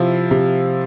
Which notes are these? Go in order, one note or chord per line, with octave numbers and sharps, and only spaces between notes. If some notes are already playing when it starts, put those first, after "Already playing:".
Already playing: C3 F3 E4
C3